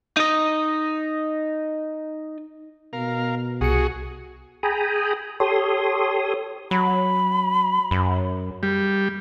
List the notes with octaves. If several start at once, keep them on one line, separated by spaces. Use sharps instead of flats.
D#4 D#5
B2 A#4 F5
C2 F#4 G#4 C#7
G#4 G5 G#5 A#5 B5 D#6
G4 A4 C#5 C6 D#6
F#3 B5
F#2
G3